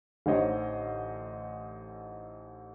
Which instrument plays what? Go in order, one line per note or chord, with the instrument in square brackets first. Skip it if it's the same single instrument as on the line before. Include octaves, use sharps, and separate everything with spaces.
[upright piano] A1 D3 D#4 C5 C#5 D#5